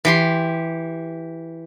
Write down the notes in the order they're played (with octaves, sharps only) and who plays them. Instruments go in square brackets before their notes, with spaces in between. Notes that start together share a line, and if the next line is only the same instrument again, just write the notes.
[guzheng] E3 G4 C6